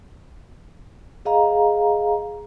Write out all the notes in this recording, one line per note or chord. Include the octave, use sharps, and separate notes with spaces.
G#4 D#5 F5 A#5